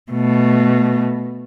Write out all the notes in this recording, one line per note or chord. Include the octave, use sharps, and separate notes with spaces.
B2 A3